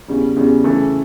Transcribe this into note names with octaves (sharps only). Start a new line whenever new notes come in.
E2 C#3 G3
E2 C#3 G3
C#3 E3 A3